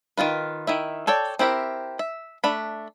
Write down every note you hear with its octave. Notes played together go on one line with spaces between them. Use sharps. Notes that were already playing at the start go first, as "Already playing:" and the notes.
D#3 A#3 F4 B4
D#3 E4 E5
A4 C#5 D5 G5
C4 E4 G4 A#4 E5
E5
A3 D4 B5